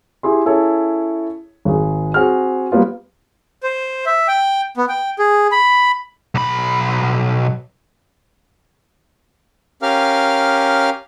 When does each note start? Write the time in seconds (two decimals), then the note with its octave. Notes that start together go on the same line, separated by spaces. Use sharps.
0.23 E4 G4 G#4 C6
0.46 C#4 E4 G#4 A4 C#5
1.65 G#1 G#4
2.14 C4 F#4 G#4 F6
2.72 G3 A#3 B3 F4
3.63 C5
4.06 E5
4.28 G5
4.77 B3
4.89 G5
5.19 G#4
5.52 B5
6.35 B1 B5
9.82 C#4 G4 A#4 F5 F6